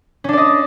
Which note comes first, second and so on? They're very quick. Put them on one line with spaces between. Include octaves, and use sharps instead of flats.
C#4 D4 D5 D#5